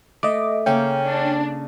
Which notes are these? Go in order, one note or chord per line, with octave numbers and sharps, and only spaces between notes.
A3 D#5 D6
C#3 A#3 C#4 A4 G5
D4